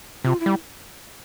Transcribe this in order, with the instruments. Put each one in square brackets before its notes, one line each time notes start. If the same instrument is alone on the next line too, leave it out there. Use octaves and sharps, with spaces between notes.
[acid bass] C3 [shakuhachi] F4
[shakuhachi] E4
[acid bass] G3